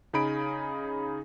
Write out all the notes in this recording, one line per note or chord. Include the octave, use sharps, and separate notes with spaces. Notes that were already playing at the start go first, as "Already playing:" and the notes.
C#3 D#4 G#4 B5 D7